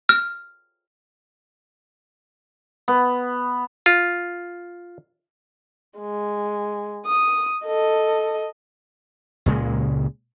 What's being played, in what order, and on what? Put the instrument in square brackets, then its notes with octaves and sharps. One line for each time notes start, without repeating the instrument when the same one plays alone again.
[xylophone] F6
[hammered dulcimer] B3
[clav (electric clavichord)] F4
[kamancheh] G#3
D#6
A4 D#5
[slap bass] C#2 A#2 C#3 G#3